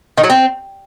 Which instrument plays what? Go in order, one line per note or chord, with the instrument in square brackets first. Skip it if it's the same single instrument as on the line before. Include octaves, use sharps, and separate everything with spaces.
[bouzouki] D#3
F#3
C4